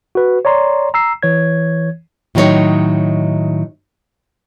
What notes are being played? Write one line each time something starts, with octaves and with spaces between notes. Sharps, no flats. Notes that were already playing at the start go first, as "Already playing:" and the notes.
F#4 B4
C#5 D5 A#5 C6
A#5 E6 C7
E3 C#5 G#6
A2 D#3 F#3 C4 D#4 C#5